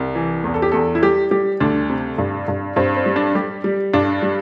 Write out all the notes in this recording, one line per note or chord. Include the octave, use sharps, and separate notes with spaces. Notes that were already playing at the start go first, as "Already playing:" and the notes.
Already playing: C2
E3
E2
A4
G4
E2 A4
E4
G3 G4
G3 G4
D2 D4
C3
G2
G2
G2 C4
C4
G3
D4
G3 G4
G3
G2 D4
G3